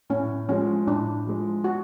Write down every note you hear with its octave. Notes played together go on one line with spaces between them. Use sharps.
A2 C#4
F3 G#3 C#4
A2 D4
F3 G#3
F#4